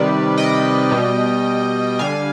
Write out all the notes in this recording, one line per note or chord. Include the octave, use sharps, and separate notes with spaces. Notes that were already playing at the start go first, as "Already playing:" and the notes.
Already playing: C3 D#3 G3 B4 D5
D#5 G5
B2 G3
D3 G3 F5 G#5